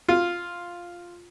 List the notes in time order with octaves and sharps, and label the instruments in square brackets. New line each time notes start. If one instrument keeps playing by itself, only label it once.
[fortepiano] F4